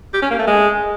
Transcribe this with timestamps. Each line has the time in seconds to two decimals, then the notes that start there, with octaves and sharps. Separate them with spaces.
0.14 G4
0.22 C#4
0.30 A#3
0.39 A3
0.47 G#3